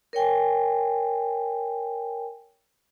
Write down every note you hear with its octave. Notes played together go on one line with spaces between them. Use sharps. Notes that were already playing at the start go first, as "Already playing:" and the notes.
A#4 C#5 G5 G#5